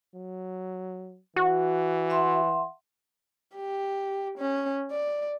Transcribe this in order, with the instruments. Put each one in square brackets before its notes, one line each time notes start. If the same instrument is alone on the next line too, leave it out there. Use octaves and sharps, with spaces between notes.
[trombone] F#3
[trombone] E3 [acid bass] F#4
[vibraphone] E5 F#5 C6
[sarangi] G4
C#4
D5